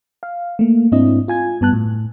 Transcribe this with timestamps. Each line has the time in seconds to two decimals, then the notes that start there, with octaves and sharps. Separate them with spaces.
0.23 F5
0.59 A3 A#3
0.92 G#2 C4 D4 E4 D#5
1.28 F4 G#5 G#6
1.61 G2 B3 A5 F#6
1.73 A2